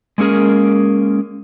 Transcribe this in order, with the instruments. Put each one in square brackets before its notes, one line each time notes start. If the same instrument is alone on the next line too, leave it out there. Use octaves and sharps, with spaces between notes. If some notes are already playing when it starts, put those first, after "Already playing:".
[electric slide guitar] G#3 A#3 C#4 G#4 A#4